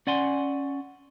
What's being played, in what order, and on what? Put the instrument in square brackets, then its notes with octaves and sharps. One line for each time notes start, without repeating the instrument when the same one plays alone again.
[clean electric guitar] C#4 D5 F#5 G#5 C6